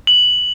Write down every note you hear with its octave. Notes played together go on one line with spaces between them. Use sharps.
F#7